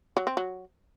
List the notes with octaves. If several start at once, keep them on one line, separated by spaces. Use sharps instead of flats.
F#3
C4
F#3